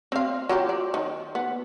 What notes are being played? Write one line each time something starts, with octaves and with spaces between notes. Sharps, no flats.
C4 F5
F#3 F4 G4
D5
D#3
B3